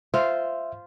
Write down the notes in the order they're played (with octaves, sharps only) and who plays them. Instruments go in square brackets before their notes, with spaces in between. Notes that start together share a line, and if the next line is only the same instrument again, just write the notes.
[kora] F4 C5 F5 [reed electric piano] E5